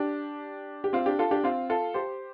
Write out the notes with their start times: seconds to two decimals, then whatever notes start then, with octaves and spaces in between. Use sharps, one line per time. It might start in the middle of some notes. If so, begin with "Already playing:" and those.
Already playing: D4 G4
0.84 G4
0.93 C4 F4
1.06 D4 G4
1.19 F4 A4
1.31 D4 G4
1.44 C4 F4
1.70 F4 A4
1.94 G4 C5